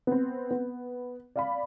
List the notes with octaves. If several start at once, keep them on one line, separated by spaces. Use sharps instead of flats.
B3 C4
B3
D5 F5 B5